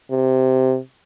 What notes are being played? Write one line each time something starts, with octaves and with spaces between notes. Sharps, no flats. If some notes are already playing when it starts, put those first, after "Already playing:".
C3